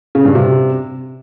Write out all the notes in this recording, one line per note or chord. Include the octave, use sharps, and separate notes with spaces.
C#3
G2
C3